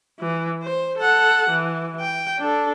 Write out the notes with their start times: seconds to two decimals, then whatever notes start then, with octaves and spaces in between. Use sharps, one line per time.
0.20 E3
0.64 C5
0.98 A4 F#5
1.50 E3
2.00 G5
2.39 D4 A4